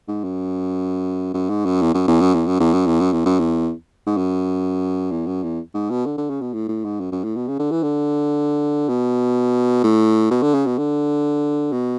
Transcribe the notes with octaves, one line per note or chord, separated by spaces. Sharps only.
G#2
F#2
F#2
G#2
F#2
E2
F#2
E2
F#2
E2
F#2
E2
F#2
E2
F#2
E2
F#2
E2
G#2
F#2
E2
F#2
E2
G#2
B2
D3
D3
C#3
B2
A2
A2
G#2
F#2
F#2
A2
B2
C#3
D3
E3
D3
B2
A2
B2
D3
C#3
B2
D3
B2